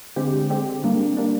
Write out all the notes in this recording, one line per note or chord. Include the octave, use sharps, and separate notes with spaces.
D3 G#3 C4 G4
D3 G#3 C4 G4
G3 A#3 D4
G3 A#3 D4